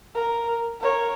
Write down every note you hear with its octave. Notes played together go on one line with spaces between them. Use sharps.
A#4
A#4 C#5